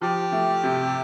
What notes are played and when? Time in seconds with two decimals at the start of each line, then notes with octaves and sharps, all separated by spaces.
0.01 F3 G4
0.32 A3
0.63 C3